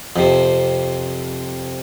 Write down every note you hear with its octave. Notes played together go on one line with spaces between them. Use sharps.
F2 C3